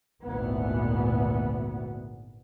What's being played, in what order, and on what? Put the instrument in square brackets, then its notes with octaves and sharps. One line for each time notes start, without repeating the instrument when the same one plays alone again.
[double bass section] G#1 D2 A#2 E3 B3